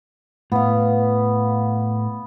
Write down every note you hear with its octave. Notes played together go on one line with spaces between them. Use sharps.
A2 B3 F5